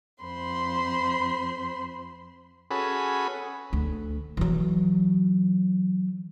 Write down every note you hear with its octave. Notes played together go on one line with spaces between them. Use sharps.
F2 C5 B5 C6
C#4 F#4 G#4 A4 B4 B5
D2
E3 F#3